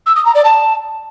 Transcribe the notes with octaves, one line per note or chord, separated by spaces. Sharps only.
E6
D#6
A#5
D5
A5